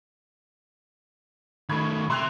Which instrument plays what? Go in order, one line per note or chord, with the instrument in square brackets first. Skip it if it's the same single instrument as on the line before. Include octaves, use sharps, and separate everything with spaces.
[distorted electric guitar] D#3 A3 [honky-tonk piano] B5 C#6 G#6
[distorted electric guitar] C3 E5 [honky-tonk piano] C6 F#6 F7